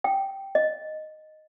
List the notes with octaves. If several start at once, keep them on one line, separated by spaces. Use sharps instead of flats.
G5
D#5